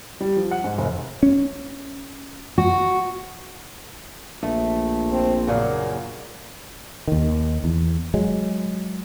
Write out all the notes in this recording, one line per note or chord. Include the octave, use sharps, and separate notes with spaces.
G3
F3
F#5
G#2
F1
C#4
F#4
A#1 A3
C4
F#2 A#2 C#3 A#3
D#2 D#3
E2
F#3 G#3